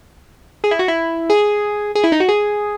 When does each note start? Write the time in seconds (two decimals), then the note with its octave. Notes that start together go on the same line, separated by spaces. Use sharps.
0.64 G#4
0.71 E4
0.79 F#4
0.88 E4
1.30 G#4
1.95 G#4
2.04 E4
2.12 D#4
2.20 F#4
2.29 G#4